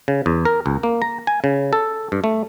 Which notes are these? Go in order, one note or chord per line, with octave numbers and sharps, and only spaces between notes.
C#3
E2
A#4
C#2
A#3
A#5
G#5
C#3
A4
G2
A3